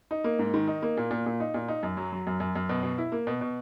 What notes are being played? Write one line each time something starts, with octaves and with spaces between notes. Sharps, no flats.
D#4
A#3
G#2
D#3
D#4
A#3
A#2
A#2
A#2
D#4
A#2
D#4
F#2
F#3
F#3
F#2
F#2
F#2
B2
B2
E4
A#3
B2
B2